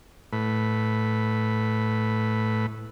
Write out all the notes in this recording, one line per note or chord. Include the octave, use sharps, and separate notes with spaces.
A2 B4